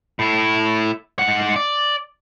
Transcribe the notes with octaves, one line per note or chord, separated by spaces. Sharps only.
A2 E4
G#2 F#5
D5